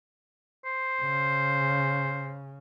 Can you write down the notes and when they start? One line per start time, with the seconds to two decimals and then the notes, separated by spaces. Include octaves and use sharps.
0.65 C5
1.02 C#3